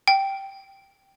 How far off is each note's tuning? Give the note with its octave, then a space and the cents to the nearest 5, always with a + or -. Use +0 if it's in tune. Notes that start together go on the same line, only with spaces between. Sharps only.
G5 -5